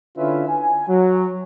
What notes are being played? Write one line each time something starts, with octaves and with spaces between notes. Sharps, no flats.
D3 C#4 E4 F4 B4 E5
G#5
F#3